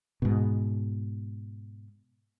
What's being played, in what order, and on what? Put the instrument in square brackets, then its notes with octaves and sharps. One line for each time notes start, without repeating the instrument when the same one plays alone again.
[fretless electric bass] G#2 B2